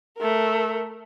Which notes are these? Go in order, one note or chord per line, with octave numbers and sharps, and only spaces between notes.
A3 A#4